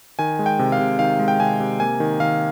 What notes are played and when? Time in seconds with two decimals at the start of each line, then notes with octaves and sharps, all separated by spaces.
0.19 D#3 G#5
0.39 G#3
0.46 G5
0.59 C3
0.72 F5
0.79 C3
0.99 D#3 F5
1.19 G#3
1.28 G5
1.39 C3 G#5
1.60 C3
1.80 A#3 G#5
2.00 D#3
2.20 D#3 F5